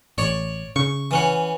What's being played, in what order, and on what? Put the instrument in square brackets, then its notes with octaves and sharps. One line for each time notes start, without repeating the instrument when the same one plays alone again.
[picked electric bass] A1 [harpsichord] C#5 D5
[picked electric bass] C#3 [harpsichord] C#6
[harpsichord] E3 C#4 F#5